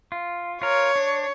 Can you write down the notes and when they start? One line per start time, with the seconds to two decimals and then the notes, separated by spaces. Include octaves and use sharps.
0.12 F4
0.62 F4 A#4 C#5
0.96 D4